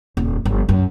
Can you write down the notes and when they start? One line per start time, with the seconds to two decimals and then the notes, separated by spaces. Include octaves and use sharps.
0.17 D#1 F2
0.45 G1 F3
0.69 F#2